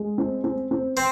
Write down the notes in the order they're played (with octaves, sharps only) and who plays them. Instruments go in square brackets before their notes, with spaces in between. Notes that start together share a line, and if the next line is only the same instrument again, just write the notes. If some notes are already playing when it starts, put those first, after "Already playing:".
Already playing: [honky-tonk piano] G#3
C4
C4
C4
[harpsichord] C4